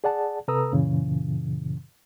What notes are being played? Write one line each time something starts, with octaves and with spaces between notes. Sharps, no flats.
G#4 D5 F#5 A5
C3 A4 B4 A#5 D#6 E6
F#2 A#2 C#3 E3